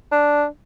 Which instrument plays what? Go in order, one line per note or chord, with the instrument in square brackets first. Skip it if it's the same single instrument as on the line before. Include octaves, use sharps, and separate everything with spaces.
[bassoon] D4